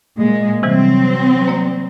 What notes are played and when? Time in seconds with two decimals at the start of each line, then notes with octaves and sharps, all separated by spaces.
0.18 A#2 G#3
0.63 C3 E3 F#3 G3 C4
1.48 A#3 D5